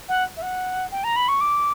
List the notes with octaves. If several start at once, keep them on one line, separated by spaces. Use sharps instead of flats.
F#5
E5
F#5
G5
A#5
B5
C#6
D6